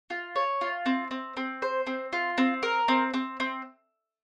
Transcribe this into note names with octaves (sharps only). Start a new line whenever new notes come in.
F4
C#5
F4
C4
C4
C4
C5
C4
F4
C4
A#4
C4
C4
C4